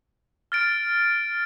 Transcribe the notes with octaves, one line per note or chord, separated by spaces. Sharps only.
F6 A6 D7